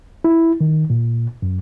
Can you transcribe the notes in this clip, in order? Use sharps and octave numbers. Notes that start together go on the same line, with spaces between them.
E4
D#3
A#2
F#2